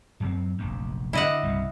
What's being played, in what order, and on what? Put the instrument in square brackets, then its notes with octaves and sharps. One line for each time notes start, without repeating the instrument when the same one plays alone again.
[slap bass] F#2 F#3 C4
F1 A#1 F#2
[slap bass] D3 [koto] E4 D#5 F#5
[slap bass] C2 G2 C#3